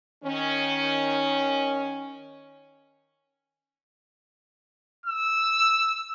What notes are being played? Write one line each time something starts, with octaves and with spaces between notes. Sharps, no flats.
D#3 C#4
E6